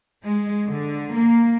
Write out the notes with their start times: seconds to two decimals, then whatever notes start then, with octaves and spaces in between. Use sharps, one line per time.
0.24 G#3
0.67 D3
1.15 A#3